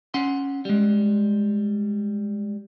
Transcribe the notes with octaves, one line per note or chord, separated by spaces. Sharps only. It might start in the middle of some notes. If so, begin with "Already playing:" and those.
C#4 F#5 C6
G3 G#3